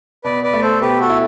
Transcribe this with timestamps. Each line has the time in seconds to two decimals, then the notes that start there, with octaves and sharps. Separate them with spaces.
0.24 B2 B4 D5
0.43 B4 D5
0.53 A3
0.62 A4 C5
0.81 B2 G4 B4
1.00 F#4 A4
1.10 E4